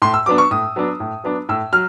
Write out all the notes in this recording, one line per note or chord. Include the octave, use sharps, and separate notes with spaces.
A2 C6
E6
F#3 B3 D4 D6
C#6
A2 D#6
F#3 B3 D4
A2
F#3 B3 D4
A2 E6
F#3 F6